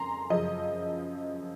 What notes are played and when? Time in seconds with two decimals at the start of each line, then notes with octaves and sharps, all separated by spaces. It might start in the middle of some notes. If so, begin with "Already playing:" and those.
Already playing: F2 C#3 G#5 A#5 C6
0.30 F#2 C#3 F3 D#5